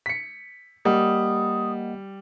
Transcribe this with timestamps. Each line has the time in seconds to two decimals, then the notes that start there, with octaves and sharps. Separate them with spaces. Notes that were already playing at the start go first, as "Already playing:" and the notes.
0.06 B6 C#7
0.85 G3 A#3 D#5 F#5 D#6